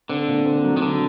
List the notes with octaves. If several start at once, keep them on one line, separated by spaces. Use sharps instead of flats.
D3 C4
A#2
C4
F#3
D#3
D3 F#3